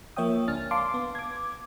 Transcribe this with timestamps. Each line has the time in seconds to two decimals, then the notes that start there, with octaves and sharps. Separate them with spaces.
0.16 F3 A#3 C#5 E5 G5 D#6
0.48 C#2 D4 G#5 F6 A6
0.71 F5 A5 C6 D6
0.94 B3
1.15 D6 G#6